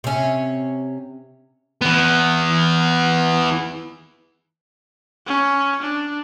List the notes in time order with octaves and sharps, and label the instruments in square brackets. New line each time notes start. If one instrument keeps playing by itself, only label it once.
[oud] C3 C#4
[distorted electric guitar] E3 B3
[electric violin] C#4
D4